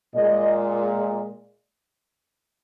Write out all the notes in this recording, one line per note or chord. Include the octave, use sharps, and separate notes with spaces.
A#2 G#3 D#5